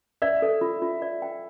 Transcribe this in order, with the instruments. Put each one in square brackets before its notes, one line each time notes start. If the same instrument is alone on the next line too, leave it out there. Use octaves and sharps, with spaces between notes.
[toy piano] D5 [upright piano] E5
[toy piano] A4
F4
F4
D5
G5